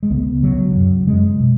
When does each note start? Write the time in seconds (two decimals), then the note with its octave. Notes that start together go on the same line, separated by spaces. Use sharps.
0.03 G#3
0.10 C#2 C#3 B3
0.43 C#2 C#3 F#3
0.75 F#2 C#3
1.07 F#2 C#3 G#3
1.40 B2